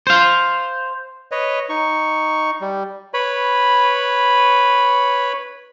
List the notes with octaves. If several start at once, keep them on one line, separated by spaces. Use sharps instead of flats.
C5 F5
B4 C#5 D#5
D#4 C#6
G3
B4 C#5 B5